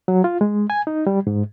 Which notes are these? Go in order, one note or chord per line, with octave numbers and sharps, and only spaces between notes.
F#3
F4
G#3
G#5
D#4
G3
G#2